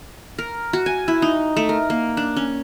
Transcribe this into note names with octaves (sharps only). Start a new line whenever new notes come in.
A#4
F#4
G#5
E4
D#4
A3
A#4
A#3
D4
C#4